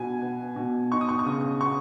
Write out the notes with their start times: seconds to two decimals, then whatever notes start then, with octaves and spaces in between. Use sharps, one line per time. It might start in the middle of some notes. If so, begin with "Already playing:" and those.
Already playing: B2 G#5
0.22 B3
0.56 B2
0.92 D#4 C#6
1.01 D#6
1.09 C#6
1.19 C#6
1.26 C#3 D#6
1.61 B3 C#6